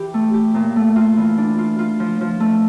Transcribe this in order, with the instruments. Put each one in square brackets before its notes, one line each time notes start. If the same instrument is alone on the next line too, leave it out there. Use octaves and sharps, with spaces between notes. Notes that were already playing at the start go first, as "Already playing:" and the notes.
Already playing: [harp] E3 G4
A3
G4
A#2
A3
F4
E3
D4
F4
F4
F3
F3
A3